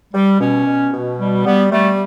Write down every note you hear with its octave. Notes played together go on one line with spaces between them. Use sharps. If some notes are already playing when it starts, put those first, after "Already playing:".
G3
B2 C#4
B2
B2
G3
G3 B3
G3 A3